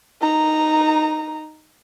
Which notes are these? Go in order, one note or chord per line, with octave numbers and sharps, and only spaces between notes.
D#4 A#5